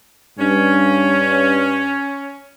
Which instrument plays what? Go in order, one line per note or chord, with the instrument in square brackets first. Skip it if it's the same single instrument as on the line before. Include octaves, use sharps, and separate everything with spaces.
[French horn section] G2 [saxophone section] C#4